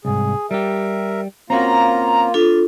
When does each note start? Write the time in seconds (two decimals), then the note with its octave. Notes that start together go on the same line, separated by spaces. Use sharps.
0.05 C2 G#2 G#4
0.51 G3 G4 A#4 E5
1.50 A#3 C4 C#4 F4 F#4 A#5
2.34 D4 F4 A4